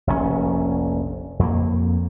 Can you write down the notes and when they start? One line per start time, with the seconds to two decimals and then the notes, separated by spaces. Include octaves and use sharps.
0.07 F1 A#1 A2 C#4
1.39 F2 A#3